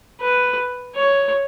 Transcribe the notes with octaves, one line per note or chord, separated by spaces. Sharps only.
B4
C#5